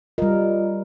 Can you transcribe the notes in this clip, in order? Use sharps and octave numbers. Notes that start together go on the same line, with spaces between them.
G3 F4 A#4 D#5